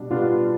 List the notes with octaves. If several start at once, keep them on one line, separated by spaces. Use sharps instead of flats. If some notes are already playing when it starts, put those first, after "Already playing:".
Already playing: B2 G3 D4
B2 G3 B3 D4 F4